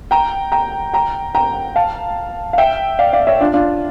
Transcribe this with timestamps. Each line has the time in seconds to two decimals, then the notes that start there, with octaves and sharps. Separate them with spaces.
0.11 G5 A#5
0.52 G5 A#5
0.94 G5 A#5
1.35 G5 A#5
1.76 F5 A5
2.53 F5
2.58 E5 G5
2.99 D5 F5
3.13 D5 F5
3.27 C#5 E5
3.40 D4 F4
3.54 D4 F4